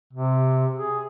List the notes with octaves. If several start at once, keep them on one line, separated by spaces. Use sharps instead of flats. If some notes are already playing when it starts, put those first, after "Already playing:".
C3
G#4